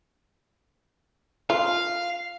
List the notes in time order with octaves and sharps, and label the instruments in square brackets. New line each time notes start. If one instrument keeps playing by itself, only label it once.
[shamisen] F4 [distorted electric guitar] F5